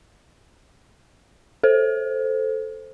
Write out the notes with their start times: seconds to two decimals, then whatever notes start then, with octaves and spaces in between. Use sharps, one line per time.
1.63 A4 C5